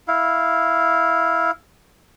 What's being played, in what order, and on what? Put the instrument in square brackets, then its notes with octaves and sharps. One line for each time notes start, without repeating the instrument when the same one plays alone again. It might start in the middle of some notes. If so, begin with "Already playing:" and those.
[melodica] E4 F5